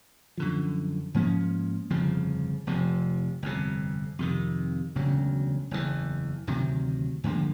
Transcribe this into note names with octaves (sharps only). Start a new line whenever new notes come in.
F#2 D3 F3
G#2 F3 A#3 C#4
G1 F2 C#3 F3
F1 F2 C3 F3
G1 F2 C3
F2 C3 D#3
E1 D2 C#3 F#3
F#1 E2 C3 E3
D2 C3 D#3 F#3
G2 D3 F3 A#3